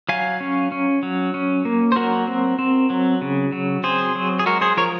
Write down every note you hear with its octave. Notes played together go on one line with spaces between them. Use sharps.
F#3 F5 G#5
C#4
C#4
F#3
C#4
A#3
C5
F#3 F#4 A#4
C4
C4
F#3
C#3
F#3
C4 G#4 C5
F#3
G#4
G#3 F#4 A#4
G#4 C5
F3 A#4 C#5